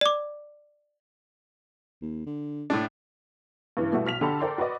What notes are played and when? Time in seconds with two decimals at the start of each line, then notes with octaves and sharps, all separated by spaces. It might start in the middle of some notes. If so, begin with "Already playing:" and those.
0.01 D5 D6
2.01 D#2
2.26 D3
2.70 A2 A3 D4
3.77 G2 C#3 E3
3.92 B2 G3 A3 E4 F#4
4.06 B1 F6 B6 F7
4.21 D3 G4 A4 A5 B5
4.40 A4 A#4 C5 D5 G5 C6
4.58 F#4 B4 C5 D5 D#5